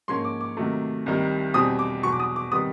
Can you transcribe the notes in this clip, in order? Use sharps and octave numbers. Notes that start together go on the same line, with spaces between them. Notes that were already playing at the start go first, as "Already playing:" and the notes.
G#2 F3 A#3 C#4 C6
D6
D6
C3 D#3 F#3 A3
C2 C3 D#3 G3
E2 B2 G3 C4 D#6
D6
E2 B2 F#3 C#6
D6
D#6
D6
C3 D#3 G3 B3 D#6